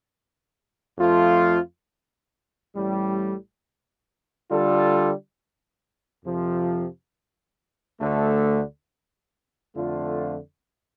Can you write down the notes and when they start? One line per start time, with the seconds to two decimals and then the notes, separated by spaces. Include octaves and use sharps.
0.97 F2 F3 A3 F4
2.73 A1 A2 G3
4.49 D3 G3 F4 A4
6.24 F2 C3 F3
8.00 D2 D3 A3
9.76 F2 D3 A3 F4